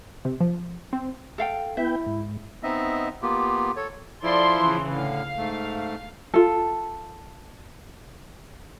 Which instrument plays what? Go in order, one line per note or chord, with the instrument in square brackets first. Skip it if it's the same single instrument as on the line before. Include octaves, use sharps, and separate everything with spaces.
[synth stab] C3
F3
C4
[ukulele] A4 F5 G5
[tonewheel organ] B3 G5 [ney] E4 [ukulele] E5
[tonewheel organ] G#2
[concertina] B3 C4 D#4 D#5 E5
A#3 B3 F4 G4
A4 C#5
[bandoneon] F3 E4 [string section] A4 D5 C6
[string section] C#3 E3
[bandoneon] A2 D3 [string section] F5
[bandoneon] G#2 A3
[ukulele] F4 A4